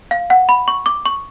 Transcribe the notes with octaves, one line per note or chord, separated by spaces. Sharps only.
F5
F#5
B5
C#6
D6
C#6